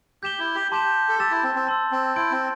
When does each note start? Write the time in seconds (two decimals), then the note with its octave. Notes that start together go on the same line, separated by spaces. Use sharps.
0.23 G4 G6 E7 G7
0.39 E4
0.55 G4
0.72 G4 A5 C6 G6 E7
1.09 A4
1.20 G4 A5 E6 A6 E7
1.31 E4
1.43 C4
1.55 C4
1.67 A5 C6 E6
1.92 C4
2.16 E4 C6 G6 D7
2.32 C4